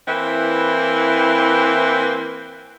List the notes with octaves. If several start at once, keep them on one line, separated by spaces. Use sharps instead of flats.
E3 A#3 C4 E4 B4